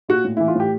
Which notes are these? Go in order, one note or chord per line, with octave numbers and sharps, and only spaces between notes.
A#2 F#4
A2
E3 E4
F4
A2 G4